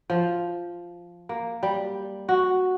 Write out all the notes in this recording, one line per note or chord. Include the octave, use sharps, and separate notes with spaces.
F3
A#3
G3
F#4